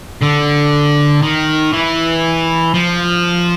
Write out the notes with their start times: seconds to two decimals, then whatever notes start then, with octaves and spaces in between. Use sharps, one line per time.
0.22 D3
1.23 D#3
1.73 E3
2.74 F3